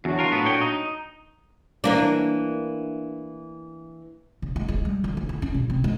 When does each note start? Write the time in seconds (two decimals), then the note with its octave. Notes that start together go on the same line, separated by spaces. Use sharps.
0.05 E2 F#3 D4 F#4
0.19 F4 A#4
0.32 A2 B3
0.45 A#2 C#5 G5
0.61 D#4
1.84 E3 A#3 D4
4.42 C#3
4.56 G#3
4.68 G#3
4.85 G3
5.04 D3
5.17 E4
5.29 E4
5.42 C#4
5.54 C3
5.70 C4
5.84 G#3